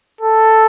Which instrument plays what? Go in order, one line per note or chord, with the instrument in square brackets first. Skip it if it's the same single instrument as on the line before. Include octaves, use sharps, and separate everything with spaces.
[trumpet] A4